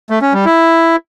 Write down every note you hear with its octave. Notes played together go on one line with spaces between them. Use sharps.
A3
C#4
G3
E4